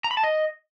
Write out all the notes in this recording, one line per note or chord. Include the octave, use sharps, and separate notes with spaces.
A#5
B5
A5
D#5